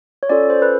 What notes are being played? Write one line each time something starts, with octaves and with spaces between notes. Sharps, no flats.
C#5
C#4 F4 A4 D5
C5
B4